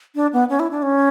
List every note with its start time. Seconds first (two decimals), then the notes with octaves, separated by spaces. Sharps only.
0.15 D4
0.33 B3
0.49 C#4
0.60 E4
0.71 D4
0.82 C#4